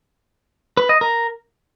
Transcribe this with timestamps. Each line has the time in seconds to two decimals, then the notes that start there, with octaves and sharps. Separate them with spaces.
0.77 B4
0.89 D#5
1.01 A#4